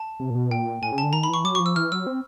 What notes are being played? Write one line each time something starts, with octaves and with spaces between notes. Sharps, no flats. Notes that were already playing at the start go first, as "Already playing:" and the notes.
Already playing: A5
C3
A#2
B2
A#2 G5
A2 G#5
C#3
A5
D3
D#3 A#5
B5
E3 C#6
F#3 D6
C#6
F3
E6
E3 F6
F#3 E6
C4